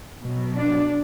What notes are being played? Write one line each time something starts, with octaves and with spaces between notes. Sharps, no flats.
B2 F#3
D4